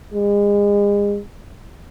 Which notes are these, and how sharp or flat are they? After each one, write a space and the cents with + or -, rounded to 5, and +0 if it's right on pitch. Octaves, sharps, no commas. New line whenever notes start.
G#3 -35